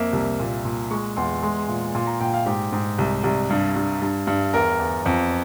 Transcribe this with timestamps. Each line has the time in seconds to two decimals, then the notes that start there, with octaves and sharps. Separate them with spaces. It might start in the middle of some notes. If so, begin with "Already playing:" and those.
Already playing: F2 A#3 E5
0.13 C2
0.39 A#2
0.65 A#2
0.91 G#3 C#6
1.17 E2 C6
1.43 G#3 C6
1.68 A#2
1.95 A#2 C6
2.07 A#5
2.20 A#2 G5
2.34 F5
2.46 G#2 G4
2.73 G#2
2.98 C2
3.24 C2
3.50 G2
3.76 G2
4.02 G2
4.27 G2
4.53 E2 A#4
4.79 E2
5.06 F2